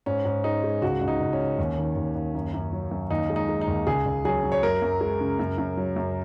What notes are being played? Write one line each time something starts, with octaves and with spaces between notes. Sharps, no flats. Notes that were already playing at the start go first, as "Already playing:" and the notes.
G#2 C#4
G#2
G#3 D#4
G#3
C#2 F#4
C#2
D#4
C#2
C#4
C#3
D#2
D#3
D#2
D#2
F#2
F#2
F#3
F#2
D#2 D#4
G#3
D#4
G#3
D#4
D#2
C#2 G#4
C#2
F#3 G#4
F#3
C#5
F#2 A#4
F#2
G#3
C#3
F#2
F#2
F#3
F#2